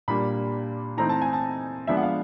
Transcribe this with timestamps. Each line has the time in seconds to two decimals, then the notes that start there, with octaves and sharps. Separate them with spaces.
0.08 A#2 G3 A#3 D4 B5
0.97 E3 A3 C4 D#4 A#5
1.09 A5
1.21 G#5
1.33 A5
1.87 F3 G#3 B3 D4 E5
1.97 F#5
2.03 F5